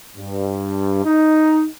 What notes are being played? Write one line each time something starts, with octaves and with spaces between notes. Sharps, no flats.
G2
D#4